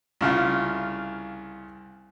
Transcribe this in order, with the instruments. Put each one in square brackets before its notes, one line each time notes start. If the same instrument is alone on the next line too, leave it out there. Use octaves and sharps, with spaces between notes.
[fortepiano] C2 C#3 F4